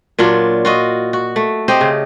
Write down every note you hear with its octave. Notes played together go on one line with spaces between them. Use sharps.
A#2 F#3 D4 F4
F4 F#4 D#5
F#4
A3
C4 G4 D#5
C#3